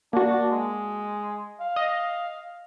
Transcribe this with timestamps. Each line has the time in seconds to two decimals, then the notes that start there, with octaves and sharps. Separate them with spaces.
0.13 A#3 D4 F#4
0.51 G#3
1.60 F5
1.76 D#5